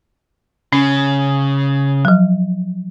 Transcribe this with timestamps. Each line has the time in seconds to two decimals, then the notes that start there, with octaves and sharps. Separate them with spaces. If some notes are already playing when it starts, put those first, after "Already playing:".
0.73 C#3 C#4
2.05 F3 F#3